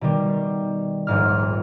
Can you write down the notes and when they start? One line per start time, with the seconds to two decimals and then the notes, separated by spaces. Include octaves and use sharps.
0.01 B2 D#3 G3
1.07 D#1 A#1 G#2 F6